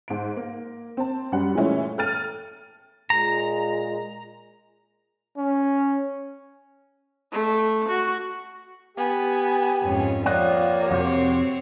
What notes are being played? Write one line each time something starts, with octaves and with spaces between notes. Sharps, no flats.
G#2 D7
A#3
C4 A5
F#2 G3 F#5
A#2 E3 G#3 A3 C#4 E4
A4 G5 F6 A6 D#7
A#2 G#3 A#5
C#4
A3
F#4
B3 G4 G#5
F2 G#2 C#4
F3 G3 A#3 C#5 D#5 F#5
F2 C3 C4 F#4 C#5